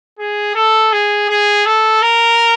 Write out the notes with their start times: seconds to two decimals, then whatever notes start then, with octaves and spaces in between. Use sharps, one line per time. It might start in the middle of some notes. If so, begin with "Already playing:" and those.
0.19 G#4
0.55 A4
0.93 G#4
1.29 G#4
1.66 A4
2.02 A#4